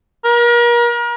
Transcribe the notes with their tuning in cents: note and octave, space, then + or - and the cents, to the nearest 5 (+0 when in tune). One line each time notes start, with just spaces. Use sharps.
A#4 +35